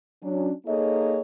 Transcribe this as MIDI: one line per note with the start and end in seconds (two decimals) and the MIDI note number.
0.23 0.51 54
0.23 0.51 61
0.23 0.51 62
0.66 1.21 58
0.66 1.21 63
0.66 1.21 68
0.66 1.21 69
0.66 1.21 73
0.66 1.21 75